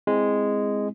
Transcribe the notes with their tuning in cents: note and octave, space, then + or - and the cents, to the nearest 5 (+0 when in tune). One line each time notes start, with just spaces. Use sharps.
G#3 -5 C4 +0 E4 +0